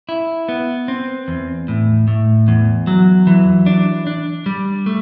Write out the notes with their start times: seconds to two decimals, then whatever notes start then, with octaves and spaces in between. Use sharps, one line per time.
0.09 E4
0.49 B3
0.88 C4
1.28 E2
1.68 A2
2.08 A2
2.48 E2
2.87 F#3
3.27 E3
3.66 D4
4.07 D4
4.46 G3
4.86 A3